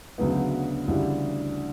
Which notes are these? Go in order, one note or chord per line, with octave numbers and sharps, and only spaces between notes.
D2 C#3 F#3 B3
D2 C#3 E3 G3